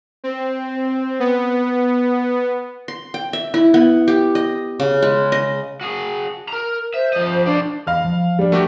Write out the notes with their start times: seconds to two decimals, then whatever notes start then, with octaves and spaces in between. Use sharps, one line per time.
0.24 C4
1.20 B3
2.88 C6
3.14 G5
3.33 E5
3.54 E4
3.74 B3
4.08 G4
4.35 D#5
4.80 C#3
5.02 G#3
5.32 D#5
5.81 F#4 G#4
6.48 A#4 A#5
6.94 C5 E5
7.13 F3 D#5
7.46 D4 C5 D5
7.87 E2 D#5 F5 B5 F6
8.04 F3
8.39 G3 D4
8.52 A3 F#4 G4 A#4